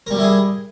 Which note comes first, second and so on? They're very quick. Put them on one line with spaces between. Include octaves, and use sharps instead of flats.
A#4 G3 G4 E4 G#4